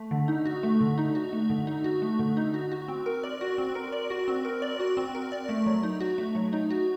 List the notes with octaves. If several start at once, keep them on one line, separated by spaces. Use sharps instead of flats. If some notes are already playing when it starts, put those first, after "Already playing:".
Already playing: A3
D3
D#4
F#4
A3
D3
D#4
F#4
A3
D3
D#4
F#4
A3
D3
D#4
F#4
F#4
C4
A#4
D5
F#4
C4
A#4
D5
F#4
C4
A#4
D5
F#4
C4
A#4
D5
A3
F#3
D#4
F#4
A3
F#3
D#4
F#4